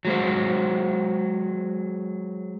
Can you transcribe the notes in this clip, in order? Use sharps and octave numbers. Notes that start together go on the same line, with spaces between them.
F#3 G#3 C5